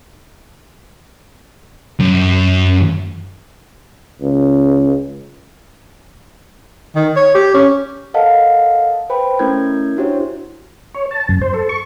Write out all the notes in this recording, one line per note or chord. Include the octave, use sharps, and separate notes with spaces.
F#2
C#2
D#3
C#5
G4
C#4
A4 A#4 D#5 F5 F#5 A5
B4 C5 G5 B5
A3 C#4 E4 A#4 G6 G#6
D4 E4 F#4 G4 C5 C#5
C#5
A5
F#2
C5
A4
C#6